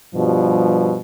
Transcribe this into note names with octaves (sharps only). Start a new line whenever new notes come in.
G2 B2 F3 G3